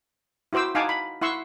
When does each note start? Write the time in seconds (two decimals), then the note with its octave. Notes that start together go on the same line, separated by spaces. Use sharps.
0.53 E4 F#4 C5 D6 E6
0.75 D#4 F5 F#5 G#5 A5 D6
0.89 B5
1.22 E4 F#5 C6 C#6 E6